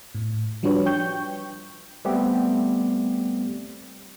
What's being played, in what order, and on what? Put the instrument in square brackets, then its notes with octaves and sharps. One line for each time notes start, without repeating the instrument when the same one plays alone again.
[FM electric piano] A2
F3 G3 D4 F#4 B4 C#5
G5 C#6 G6
[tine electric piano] G3 A3 B3 C4 G4